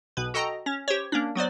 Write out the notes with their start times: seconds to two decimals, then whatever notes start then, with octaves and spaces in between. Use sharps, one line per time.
0.17 B1 B2 B4
0.34 F#4 A4 D#5 G5 A#5
0.66 C#4
0.88 G4 C5 C#5
1.12 A#3 C#4 D4
1.35 F#3 B3 C5 D5